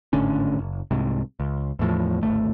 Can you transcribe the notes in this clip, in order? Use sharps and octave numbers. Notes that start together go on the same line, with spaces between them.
G#1 A2 D3 C#4
F#1
C2 G#2 C3
C#2
E2 A2 F3
D1 G#1 A3